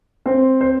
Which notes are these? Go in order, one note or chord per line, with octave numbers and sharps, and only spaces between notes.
C4 C5
C5